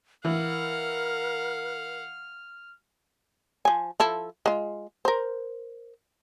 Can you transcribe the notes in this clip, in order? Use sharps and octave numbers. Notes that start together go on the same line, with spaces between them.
E3 A#4 F5 F#5 F6
F3 G#5
F3 E4 A4
G#3 F4
A#4 C5